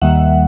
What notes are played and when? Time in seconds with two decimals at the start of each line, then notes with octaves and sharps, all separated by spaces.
0.01 D#2 D#3 G3 A#3 E5 F#5